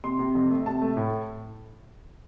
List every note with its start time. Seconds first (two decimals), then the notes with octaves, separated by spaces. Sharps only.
0.04 C3 C6
0.19 C3
0.35 F2
0.51 A3
0.66 C3 A5
0.82 A3
0.97 A2